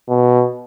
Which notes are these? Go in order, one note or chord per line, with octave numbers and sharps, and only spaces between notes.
B2